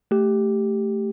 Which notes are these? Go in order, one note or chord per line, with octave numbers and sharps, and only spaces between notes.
A3 G4